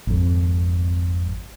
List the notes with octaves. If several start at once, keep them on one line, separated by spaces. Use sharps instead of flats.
G#1 F2